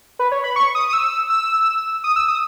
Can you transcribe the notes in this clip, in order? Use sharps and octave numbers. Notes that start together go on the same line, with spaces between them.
B4
C#5
B5
C#6
D#6
D#6
E6
E6
D#6
E6
D#6